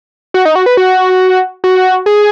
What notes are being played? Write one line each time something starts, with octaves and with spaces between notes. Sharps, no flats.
F#4
D#4
F#4
B4
F#4
F#4
G#4